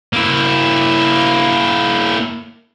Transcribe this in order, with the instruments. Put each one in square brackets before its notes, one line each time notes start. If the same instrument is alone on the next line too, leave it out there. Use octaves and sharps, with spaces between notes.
[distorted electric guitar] A#3 E4